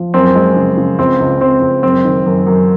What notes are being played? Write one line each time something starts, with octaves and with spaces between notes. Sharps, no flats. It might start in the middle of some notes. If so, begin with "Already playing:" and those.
Already playing: F3
F#2 C4
G#3
C#3
C#3
C#2 C4
C#2
C#2 C4
C#2
F#2 C4
D#3
F#2
F#2